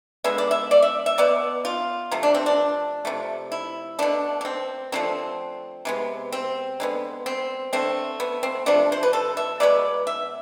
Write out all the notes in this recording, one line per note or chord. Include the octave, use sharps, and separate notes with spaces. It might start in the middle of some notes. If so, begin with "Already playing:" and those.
D3 G#3 B3 E5
D5
E5
D5
E5
E5
B2 B3 D5
F4
C3 F3 A3
D4
C4
D4
C3 F3 A3
E4
B2 A3 D4
D4
C4
D3 F3 A3 C4
C3 G#3 B3
C4
D3 G#3 B3
C4
D3 A3 C4
B3
C4
C3 F3 A3 D4
C5
B4
A4
E5
B2 G#3 B3 D5
E5